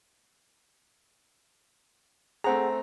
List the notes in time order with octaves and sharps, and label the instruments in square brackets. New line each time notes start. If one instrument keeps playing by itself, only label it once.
[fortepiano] A3 C4 A#5 [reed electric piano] G#4 F#5